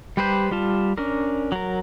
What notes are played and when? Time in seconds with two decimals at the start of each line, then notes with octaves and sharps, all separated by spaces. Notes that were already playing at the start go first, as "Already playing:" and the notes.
0.17 G3 G4 B4 C5 G6
0.51 G3 F4 A5
0.98 C#4 D4 A#4
1.52 F#3 A#4